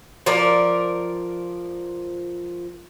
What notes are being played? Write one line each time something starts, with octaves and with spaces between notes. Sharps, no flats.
F3 A#4 D5